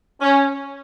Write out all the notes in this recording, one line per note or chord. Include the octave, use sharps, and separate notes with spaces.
C#4